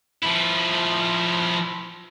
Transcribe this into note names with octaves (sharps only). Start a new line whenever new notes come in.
F3 E4